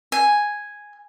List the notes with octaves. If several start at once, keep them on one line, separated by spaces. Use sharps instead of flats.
G#5